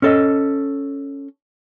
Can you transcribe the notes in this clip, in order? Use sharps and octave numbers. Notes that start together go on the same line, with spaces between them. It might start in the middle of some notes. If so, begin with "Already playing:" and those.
C#4 A4 D#5